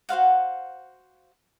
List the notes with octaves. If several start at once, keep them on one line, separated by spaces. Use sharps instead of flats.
F#4 C5 F5 F#5